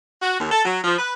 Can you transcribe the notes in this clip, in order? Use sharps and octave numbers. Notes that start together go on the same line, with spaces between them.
F#4
D#2
A4
F#3
F3
B4